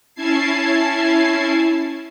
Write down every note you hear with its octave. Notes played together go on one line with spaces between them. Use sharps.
C#4 E4 A5 G#6 C7